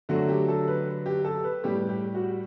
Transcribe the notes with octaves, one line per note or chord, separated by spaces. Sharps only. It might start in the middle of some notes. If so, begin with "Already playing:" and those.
D3 F#3 A3 F#4
G4
A4
B4
G4
A4
B4
A2 G3 G4
G4
F#4